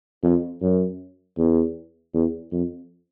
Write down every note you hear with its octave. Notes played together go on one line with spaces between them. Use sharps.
F2
F#2
E2
E2
F2